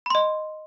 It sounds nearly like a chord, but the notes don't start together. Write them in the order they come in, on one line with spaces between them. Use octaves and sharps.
B5 C6 D#5